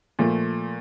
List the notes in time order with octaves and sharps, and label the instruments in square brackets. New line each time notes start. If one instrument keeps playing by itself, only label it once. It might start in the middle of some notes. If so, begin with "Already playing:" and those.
[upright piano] A#2 F3 A3